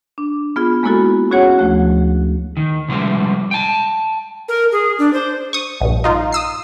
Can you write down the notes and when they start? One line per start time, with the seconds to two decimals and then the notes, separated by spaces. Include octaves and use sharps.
0.18 D4
0.56 B3 F4 G#4
0.83 G#3 A#3 B3 E4 F#4 A4
1.31 C#4 F#4 G#4 C#5 F#5
1.58 D2 F3 A3 F#6
2.57 D#3
2.88 C3 F3 G3 G#3
3.51 G5 A5
4.48 A#4
4.72 G#4
4.99 D4
5.13 C5
5.53 C#6 D#6
5.81 A#1 G2
6.04 D#4 F4
6.33 D#6 E6 C7